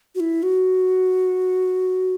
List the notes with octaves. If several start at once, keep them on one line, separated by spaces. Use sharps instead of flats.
F#4
E4
F#4